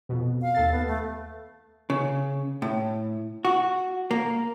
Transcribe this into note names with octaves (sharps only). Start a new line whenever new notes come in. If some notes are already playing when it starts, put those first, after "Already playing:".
F2 B2
F5
D#2 A4 A6
B3
A3
C#3
A2
F#4
A#3